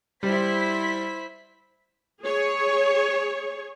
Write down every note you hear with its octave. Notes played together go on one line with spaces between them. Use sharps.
G3 E4 C5 B6
G#4 C#5